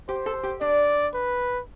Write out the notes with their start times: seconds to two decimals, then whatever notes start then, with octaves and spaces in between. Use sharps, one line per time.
0.08 G4 C5
0.26 A4
0.43 G4
0.61 D4 D5
1.14 B4